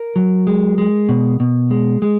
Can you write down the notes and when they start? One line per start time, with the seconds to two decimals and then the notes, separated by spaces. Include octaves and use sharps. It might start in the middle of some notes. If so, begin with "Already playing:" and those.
Already playing: A#4
0.16 F#3
0.47 G#3
0.78 G#3
1.09 B2
1.40 B2
1.71 G#3
2.02 G#3